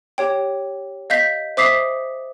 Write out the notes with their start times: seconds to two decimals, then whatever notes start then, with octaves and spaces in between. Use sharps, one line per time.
0.18 G4 C#5 G5
1.10 D#5 F5 G6 B6
1.57 C5 E5 D6 D#6 B6 C7